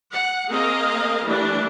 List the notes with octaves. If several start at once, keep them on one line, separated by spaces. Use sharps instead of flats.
F#5
A#3 C4 G#4 A#4 D#5 F5
E3 G3 A3 A#3 D4